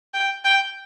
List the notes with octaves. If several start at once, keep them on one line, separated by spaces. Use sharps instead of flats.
G5
G5